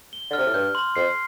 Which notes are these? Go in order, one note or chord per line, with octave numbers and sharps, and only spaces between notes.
G7
D3
C3 F6
A2
G2 G6
C6
F2 C7